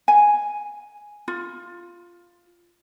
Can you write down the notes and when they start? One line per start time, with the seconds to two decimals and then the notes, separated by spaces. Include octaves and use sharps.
0.08 G#5
1.28 F4